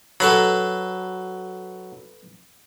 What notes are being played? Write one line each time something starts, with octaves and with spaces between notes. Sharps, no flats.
F#3 A4 B4 B5